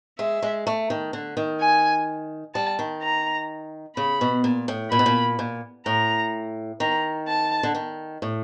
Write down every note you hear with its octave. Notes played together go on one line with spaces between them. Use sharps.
G#3 E5
G#3
A3
D#3
D3
D#3
G#5
G3 A5
D#3
A#5
C#3 B5
B2
A#2
A2
A#2 B5
B2
A#2
A#2
A2 A#5
D#3 A#5
A5
D3
D#3
A2